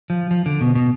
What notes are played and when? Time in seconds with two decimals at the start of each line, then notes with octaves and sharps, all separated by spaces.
0.10 F3
0.31 F3
0.46 D3
0.61 B2
0.75 B2